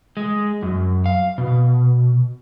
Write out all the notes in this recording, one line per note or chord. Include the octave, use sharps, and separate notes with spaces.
G#3
F#2
F5
B2